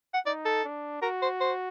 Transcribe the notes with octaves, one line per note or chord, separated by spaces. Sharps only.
F#5
D#4 D5
A4
D4
F#4 A#4
C5
C5